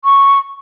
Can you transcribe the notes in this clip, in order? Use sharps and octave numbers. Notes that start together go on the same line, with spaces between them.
C#6